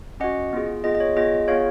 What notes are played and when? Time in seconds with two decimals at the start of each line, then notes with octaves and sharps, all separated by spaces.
0.20 C#4 F#4 D#5 F#5
0.53 B3 F4 G#4
0.84 B3 F4 G#4 D#5
0.95 D#5
1.00 C#5
1.16 B3 F4 G#4 D#5
1.48 B3 F4 G#4 C#5 F5